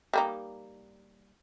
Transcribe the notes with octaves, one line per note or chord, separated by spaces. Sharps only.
G3 A#3 D#4